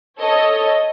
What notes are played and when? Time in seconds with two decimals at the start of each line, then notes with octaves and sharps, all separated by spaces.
0.20 A4 C#5 D#5